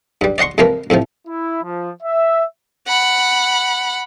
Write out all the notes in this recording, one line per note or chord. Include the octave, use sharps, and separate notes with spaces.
G2 G3
D5 D#5 F#5 C6 C#6
F2 C3 F3 A#3 A#4 B4
F2 A2 C3 F3
E4
F3
E5
F#5 B5